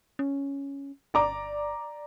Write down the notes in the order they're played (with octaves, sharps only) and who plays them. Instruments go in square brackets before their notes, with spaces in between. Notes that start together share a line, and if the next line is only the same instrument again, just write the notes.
[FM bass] C#4
[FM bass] G1 [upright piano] D5 A#5 D6